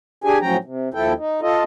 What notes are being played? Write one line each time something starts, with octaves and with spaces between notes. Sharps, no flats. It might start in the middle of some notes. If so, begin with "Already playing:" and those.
D4 G4 G#4 G#5
A2 F3 F#3 C#4 G5 A#5
C3
D#2 F3 E4 A4 G5
D#4
F4 A4 D#5